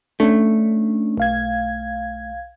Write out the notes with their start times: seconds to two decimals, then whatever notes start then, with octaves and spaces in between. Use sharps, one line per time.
0.20 A3 C#4 D4
1.17 B1 F5 G#6